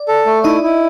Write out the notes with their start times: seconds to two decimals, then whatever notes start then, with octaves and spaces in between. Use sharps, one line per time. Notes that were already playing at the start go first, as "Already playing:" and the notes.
Already playing: D5
0.08 A4
0.26 A3
0.44 D#4 E4 D#5
0.63 E4